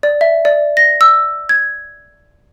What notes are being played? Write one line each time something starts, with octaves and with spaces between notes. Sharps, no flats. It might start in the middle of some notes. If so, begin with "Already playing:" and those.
D5
E5
D5
A#6
E6
G#6